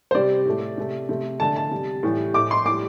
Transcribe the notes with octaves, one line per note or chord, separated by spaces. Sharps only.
C5
C3 G3 D5
A2 A3
C3 A3
C3 A3
D3 A3 A5
A5
C3 G3
A2 E3 G3
A2 A3 D6
C6
A2 D6
G3